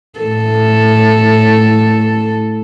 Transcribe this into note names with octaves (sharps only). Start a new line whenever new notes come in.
A2 A4